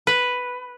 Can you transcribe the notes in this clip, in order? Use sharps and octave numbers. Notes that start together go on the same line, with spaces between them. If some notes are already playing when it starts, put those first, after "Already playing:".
B4